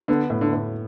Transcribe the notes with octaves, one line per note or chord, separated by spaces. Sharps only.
D3 B3
A2
D3
A2